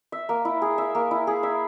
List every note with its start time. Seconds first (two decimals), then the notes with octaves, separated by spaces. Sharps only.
0.12 E5
0.29 A#3
0.45 E4
0.62 G#4
0.78 E5
0.95 A#3
1.11 E4
1.27 G#4
1.43 E5